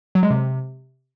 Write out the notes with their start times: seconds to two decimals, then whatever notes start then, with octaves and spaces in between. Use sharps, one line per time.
0.15 F#3
0.23 G#3
0.30 C3